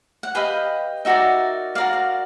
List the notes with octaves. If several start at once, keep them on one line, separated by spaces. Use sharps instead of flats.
F#5
G4 B4 D#5 F5
D#4 F#4 A#4 D5 E5
F#4 A#4 D5 F5
F5